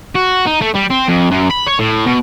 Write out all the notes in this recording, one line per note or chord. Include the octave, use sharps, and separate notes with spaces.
F#4
D#4
A3
G3
C4
F2
F#2
B5
C#5
A2
B2